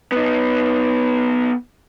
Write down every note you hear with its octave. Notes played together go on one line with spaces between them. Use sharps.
B3 D#4